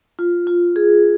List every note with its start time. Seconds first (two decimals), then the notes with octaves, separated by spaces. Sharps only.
0.19 F4
0.47 F4
0.76 G#4